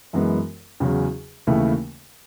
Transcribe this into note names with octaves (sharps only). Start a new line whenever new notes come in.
F#2 E3 G#3 B3
E2 C#3 F#3 C#4
D#2 C#3 E3 A3 E4